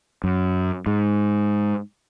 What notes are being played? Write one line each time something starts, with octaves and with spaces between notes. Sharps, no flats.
F#2
G#2